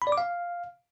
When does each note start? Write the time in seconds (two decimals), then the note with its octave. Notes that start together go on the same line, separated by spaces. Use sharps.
0.02 B5
0.07 D5
0.12 D6
0.18 F5